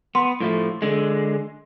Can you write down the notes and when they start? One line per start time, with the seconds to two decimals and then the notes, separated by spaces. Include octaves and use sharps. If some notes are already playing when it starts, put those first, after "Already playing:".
0.15 B3 C6
0.41 A2 F3 A3
0.82 D3 G#3